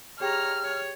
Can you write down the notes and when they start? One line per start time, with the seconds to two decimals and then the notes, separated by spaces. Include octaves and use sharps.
0.21 G4 G#4 C#5 G5 A#5 F6
0.64 C#5